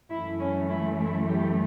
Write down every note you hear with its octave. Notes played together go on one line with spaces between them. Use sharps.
F#2 E3 A3 E4
C#4
E4
E4
G4